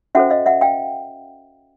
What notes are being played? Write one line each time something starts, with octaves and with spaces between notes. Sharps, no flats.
C#4 F#4 A4 C5 E5 F#5
D#5 F5
E5 F#5
F5 G5